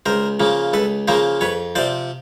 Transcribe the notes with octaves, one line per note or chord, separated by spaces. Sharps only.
C#2 A#4 C5
C#3 F3 A#3
C#2 A4 B4
C#3 F3 A#3 A#4 C5
F2 B4 C#5
C3 F3 C5 D5